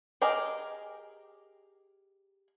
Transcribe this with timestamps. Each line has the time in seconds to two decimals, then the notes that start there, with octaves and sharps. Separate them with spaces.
0.21 G4 G#4 A#4 D#5 G5